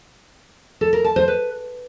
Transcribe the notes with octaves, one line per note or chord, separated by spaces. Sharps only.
A4
A#4
A5
C5
B4